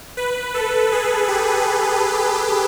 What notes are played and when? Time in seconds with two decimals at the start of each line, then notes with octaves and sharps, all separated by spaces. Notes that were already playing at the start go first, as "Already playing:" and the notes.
0.17 B4
0.54 A4
0.92 G#4
1.29 G4